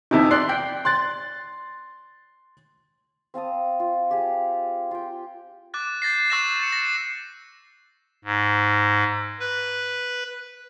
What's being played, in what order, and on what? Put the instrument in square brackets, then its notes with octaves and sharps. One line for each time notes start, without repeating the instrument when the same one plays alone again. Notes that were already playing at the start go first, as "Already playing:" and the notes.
[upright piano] F2 C3 E3 [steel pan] D#4 E5
[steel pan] D5 C6 [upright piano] F#6 C7
[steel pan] G5
[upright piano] C6 F#6 A6
[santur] C4 F5 A5 D#6
F4
G4 G#4 F5
F4 G5
[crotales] D6 F#6 A6
G6 A6 A#6 C7
C#6 E6 F#6 A#6 C7 E7
A6 C#7
A#6
[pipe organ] G#2
B4